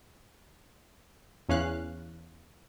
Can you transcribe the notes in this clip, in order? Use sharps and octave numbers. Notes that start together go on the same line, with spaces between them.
E2 C#4 F5 F#6